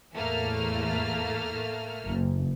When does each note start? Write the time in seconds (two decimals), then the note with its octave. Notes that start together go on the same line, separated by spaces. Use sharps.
0.15 E2 A2 A3 A#3 F6
2.07 F#1